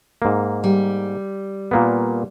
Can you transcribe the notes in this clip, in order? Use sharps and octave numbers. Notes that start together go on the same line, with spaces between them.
G#2 A#3
G3
A#2 A#3 B3